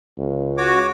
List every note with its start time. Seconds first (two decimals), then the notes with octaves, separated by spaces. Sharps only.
0.18 C#2
0.58 F#4 C#5 D6